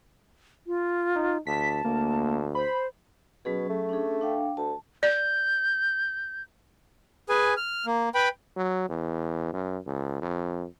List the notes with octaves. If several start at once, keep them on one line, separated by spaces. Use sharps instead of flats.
F4
D#4
D2 A5 B6
D2 A#3
C5 B5
B2 F#3 C#4 G#4
A3
C#4 D4 G#4
D4 F5 G5
D2 A5
D5 G6
G#4 B4 G#5
F6
A#3
B4 G5 B5
F#3
E2
F#2
C#2
F2